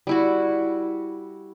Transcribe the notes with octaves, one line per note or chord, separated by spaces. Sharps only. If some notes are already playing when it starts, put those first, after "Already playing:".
G3 E4 F#4